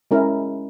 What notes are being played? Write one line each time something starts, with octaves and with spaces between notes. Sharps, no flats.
G#3 C#4 E4 A#4